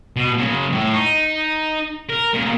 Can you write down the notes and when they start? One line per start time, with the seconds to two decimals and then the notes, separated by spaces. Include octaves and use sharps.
0.16 B2
0.38 C#3 F#3
0.72 A2
0.93 D#4
2.10 A#4
2.34 A#2 C#3